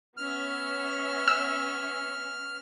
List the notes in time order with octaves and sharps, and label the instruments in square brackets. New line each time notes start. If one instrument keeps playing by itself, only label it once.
[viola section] B3 C#4 E5 [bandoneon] F6
[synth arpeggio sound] E6